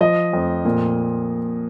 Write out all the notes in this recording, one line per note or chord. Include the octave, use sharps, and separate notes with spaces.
F3 D#5
F2
A#2